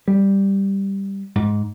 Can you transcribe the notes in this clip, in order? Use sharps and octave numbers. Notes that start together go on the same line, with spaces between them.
G3
G#2